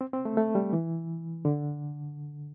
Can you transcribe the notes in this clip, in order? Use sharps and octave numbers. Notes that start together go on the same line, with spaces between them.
C4
C4
A3
A3
G3
E3
D3